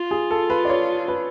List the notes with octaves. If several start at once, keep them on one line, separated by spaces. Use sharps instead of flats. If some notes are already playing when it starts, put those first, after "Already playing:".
Already playing: F4
G#4
A4
B4
D5
C#5
B4